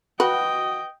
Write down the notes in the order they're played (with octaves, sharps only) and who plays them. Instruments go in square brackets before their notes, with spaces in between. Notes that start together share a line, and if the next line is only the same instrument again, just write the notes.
[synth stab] F#4 [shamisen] B4 [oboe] D#5 [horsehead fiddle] G5